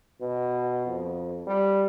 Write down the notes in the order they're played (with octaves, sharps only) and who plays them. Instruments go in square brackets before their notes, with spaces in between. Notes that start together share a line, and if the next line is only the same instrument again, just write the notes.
[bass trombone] B2
F2
G3